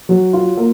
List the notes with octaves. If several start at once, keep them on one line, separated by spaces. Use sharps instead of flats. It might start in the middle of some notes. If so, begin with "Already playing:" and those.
F#3
F4
A#3